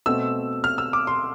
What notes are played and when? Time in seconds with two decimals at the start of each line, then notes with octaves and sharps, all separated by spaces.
0.06 B2 A3 C4 E6
0.64 F6
0.78 E6
0.93 D6
1.07 C6